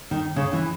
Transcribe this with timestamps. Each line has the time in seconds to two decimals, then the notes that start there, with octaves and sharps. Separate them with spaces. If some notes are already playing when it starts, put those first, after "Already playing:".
0.11 D#3
0.36 C#3
0.53 E3